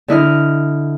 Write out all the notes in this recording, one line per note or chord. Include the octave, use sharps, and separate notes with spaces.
D3 E4 D#5 F6